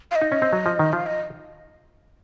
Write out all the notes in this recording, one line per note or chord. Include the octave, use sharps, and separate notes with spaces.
F5
D#5
D#4
C#4
C4
F#3
F3
D#3
F3 F5
D#5